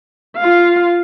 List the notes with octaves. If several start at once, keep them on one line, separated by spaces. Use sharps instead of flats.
F4 F5